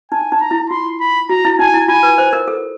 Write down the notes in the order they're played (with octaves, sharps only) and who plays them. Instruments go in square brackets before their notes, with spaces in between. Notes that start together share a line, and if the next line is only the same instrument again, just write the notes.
[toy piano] D#4 [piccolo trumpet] G#5
[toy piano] D#4
[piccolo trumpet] A#5
[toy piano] E4
[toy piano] F4 [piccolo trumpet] C6
[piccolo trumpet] B5
[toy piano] F#4 [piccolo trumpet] A#5
[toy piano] E4
[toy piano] D#4 [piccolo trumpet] G#5
[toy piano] E4
[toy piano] F4 [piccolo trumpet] G#5
[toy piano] B4
C5
A#4
A4